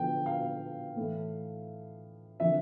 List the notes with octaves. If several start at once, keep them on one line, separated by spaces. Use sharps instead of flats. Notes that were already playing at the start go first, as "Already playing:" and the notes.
Already playing: D3 F3 B3 G5
F5
A2 E3 A3
D3 F3 C4 E5